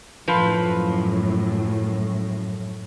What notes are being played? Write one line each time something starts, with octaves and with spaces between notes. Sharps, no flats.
F#2 A2 F3 B4